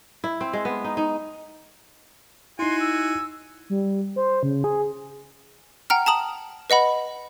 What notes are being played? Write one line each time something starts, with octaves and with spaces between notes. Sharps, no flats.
E4
C4
G#3
B3
D#4
D#4
D#4 E4 F#4 G#5 C6
E6
G3
C5
C#3
G#4
F#5 G5 A#5 F6
A5 A#5 D#6 F#7
B4 D#5 F#5 B5